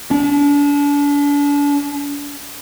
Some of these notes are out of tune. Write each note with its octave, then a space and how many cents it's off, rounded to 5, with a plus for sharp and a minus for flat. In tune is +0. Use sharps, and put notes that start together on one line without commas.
D4 -35